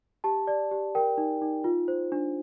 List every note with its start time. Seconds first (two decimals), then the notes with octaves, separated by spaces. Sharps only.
0.24 G4 A5
0.47 D5
0.71 G4
0.95 A#4 G5
1.18 D#4
1.42 D#4
1.64 F4
1.88 C5
2.12 D4